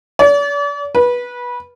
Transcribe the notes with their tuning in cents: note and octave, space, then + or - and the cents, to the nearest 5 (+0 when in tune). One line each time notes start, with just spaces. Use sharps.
D5 -40
B4 -20